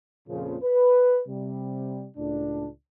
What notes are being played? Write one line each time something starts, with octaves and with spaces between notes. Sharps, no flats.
F2 A#2 C#3 F3
B4
C3 G3
C#2 A2 D4